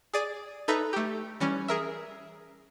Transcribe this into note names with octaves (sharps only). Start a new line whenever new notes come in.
G#4 D5 D#7
D#4 A4 B4 E5 A#5
A3 G4
E3 G3 C#4
G#4 A#4 E5